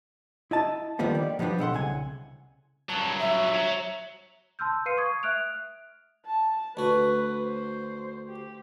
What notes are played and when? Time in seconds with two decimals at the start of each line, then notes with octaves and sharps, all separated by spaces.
0.51 E4 D#5 A5
0.99 D3 D#3 F3 G3 A#3 B3
1.15 D5
1.39 F3 G3 B3 C#4 D4
1.58 B1 A4 F#5 C6
1.73 C2 C#3 G#5
2.89 G2 F#3 A5
3.19 E5
3.54 C#5 A#5
4.59 A5 C6 E6 F6 G6
4.86 B4 F5 C6 C7 C#7 D#7
4.97 C#6 D#6 G#6
5.23 E5 F6 F#6 D7 F7
6.26 A5
6.77 D2 F#4 B4
7.44 C5
8.29 G4